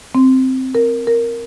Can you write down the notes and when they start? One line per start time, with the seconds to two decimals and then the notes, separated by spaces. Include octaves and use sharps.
0.15 C4
0.75 A#4
1.07 A#4